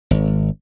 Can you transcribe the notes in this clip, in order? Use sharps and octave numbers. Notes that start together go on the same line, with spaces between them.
G#1